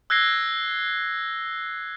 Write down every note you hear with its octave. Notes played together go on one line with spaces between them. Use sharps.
E6 F#6 G#6 A#6 C7 G7